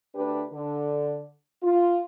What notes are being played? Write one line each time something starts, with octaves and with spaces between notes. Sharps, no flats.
D2 D4 G4 B4
D3
F4